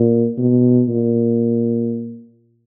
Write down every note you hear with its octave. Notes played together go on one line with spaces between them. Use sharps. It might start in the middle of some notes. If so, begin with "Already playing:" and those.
Already playing: A#2
B2
A#2